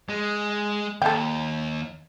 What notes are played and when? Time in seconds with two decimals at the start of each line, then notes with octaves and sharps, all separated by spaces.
0.09 G#3
1.02 D#2 A4 G5